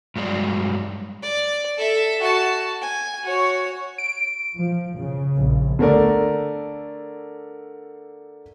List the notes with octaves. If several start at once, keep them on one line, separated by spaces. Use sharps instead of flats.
G2 F#3 G#3 D5
D5
A4 E5
F#4 A5
G#5
F#4 C#5
D7
F3
C#3
A#1
D3 A3 A#4 D5